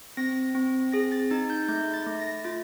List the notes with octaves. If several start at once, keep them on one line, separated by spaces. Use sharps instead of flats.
C4 A#6
C4
G#4 A#6
A6
D#4 A6
G6
A3 G6
A6
A3
A#6
F4 A6